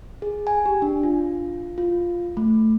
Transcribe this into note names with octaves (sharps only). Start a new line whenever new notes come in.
G#4
G#5
G4
D4
F4
F4
A3